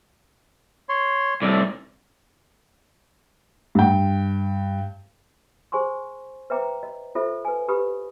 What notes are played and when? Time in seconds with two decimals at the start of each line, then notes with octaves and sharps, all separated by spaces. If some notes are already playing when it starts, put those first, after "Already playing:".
0.89 C#5 C6
1.42 C2 A2 D5
3.75 G2 G5
5.72 G#4 C5 G#5 C6 C#6
6.50 B4 C5 E5 G5 A#5 D6
6.83 D#5
7.15 F4 A4 C5 E5
7.45 B4 G#5
7.68 G4 B4 B5 D#6